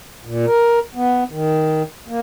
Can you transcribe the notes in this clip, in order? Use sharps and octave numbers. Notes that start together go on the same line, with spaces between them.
A#2
A#4
B3
D#3
A#3